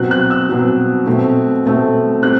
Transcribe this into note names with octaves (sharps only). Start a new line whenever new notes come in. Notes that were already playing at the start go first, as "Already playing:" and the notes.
Already playing: B2 F#3 C4 F#6
F#6
E6
B2 F#3 C4
B2 A3 C4
B2 A3 C4
G3 C4 F#6